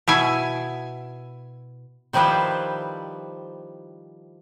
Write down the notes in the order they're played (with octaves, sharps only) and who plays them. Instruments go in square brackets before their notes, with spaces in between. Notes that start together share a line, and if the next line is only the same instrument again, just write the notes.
[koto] B2 E4 G#5
D#3 F3 G3 E4 B4 C5